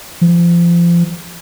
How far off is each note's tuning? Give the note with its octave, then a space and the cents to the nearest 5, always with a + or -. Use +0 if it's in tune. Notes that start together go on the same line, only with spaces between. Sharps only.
F3 -30